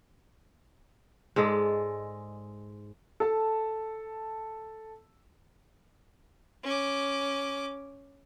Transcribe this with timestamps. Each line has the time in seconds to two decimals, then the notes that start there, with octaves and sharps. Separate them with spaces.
1.36 G#2 G#3 A4 D5
3.20 A4 A5
6.64 C#4 D6